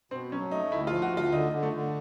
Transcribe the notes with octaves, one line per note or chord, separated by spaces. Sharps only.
B2 C4
F#3 C#4
A3 D#4
D2 E4
F4
F3
F#4
D2 F4
D3 D#4
D3
A3
D3